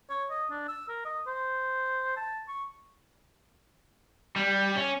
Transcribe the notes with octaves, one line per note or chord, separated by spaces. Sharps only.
C#5
D#5
D4
E6
A#4
D#5
C5
A5
C#6
G3
C#4